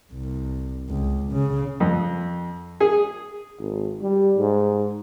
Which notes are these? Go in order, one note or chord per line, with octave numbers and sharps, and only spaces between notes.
C2
C#2
C#3
F2
G#4
G#1
G3
G#2